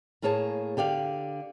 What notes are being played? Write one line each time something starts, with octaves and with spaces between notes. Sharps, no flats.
A2 A#3 G#4 C#5 A5
D3 G4 D5 F5